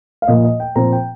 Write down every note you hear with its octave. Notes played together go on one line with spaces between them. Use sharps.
F5
A#2 F3 A#3 D#5
D#5
G5
A#2 F3 C4 A#5
G5